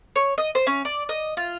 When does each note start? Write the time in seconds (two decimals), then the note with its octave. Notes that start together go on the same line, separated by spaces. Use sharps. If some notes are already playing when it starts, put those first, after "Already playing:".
0.16 C#5
0.38 D#5
0.55 C5
0.67 C#4
0.85 D5
1.09 D#5
1.37 F4